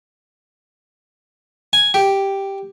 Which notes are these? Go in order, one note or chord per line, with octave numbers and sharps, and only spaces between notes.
G#5
G4